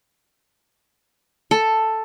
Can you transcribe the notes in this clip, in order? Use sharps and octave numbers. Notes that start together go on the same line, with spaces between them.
A4